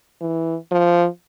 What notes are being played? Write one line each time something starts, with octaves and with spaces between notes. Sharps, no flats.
E3
F3